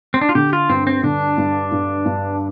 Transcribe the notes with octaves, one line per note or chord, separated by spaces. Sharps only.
C4
D4
F4
D3 G4
F4
G2 C4
C4
D3 D4
G2
G2
G2